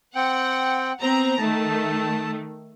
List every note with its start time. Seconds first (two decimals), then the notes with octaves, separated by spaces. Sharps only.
0.15 C4 F#5 G5
1.00 B3 C4 A#5
1.38 D#3 A3 A5